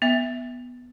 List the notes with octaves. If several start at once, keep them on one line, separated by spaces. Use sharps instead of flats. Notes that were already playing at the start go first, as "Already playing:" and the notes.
B3 E5